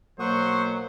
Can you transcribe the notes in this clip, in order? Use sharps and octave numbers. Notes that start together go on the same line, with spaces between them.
B2 F#3 A#3 C5 F#5 C#6 D#6